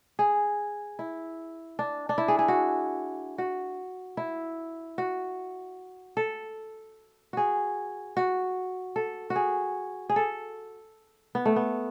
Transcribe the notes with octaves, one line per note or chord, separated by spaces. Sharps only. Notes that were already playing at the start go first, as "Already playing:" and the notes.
G#4
E4
D4
D4
E4
G#4
G#4
F#4
F#4
E4
F#4
A4
F#4 G#4
F#4
A4
F#4
G#4
G#4
A4
B3
A3
B3